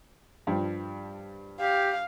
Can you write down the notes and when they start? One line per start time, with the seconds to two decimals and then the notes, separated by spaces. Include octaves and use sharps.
0.47 G2 F3 G3
1.61 G4 F5